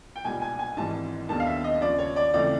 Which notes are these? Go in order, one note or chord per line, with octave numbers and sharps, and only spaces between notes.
G5
B1 A#2 G3 G#5
G#5
G#5
G#1 G#2 E3 G3 C4 A5
D#2 D3 G3 B3 D#4 A5
F5
E5
D#5
D#2 C#3 F3 D5
C#5
D5
C#2 C#3 E3 A3 C4 D5